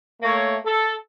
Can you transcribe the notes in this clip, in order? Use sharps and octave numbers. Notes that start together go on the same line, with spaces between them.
A3 A#3 C#5
A4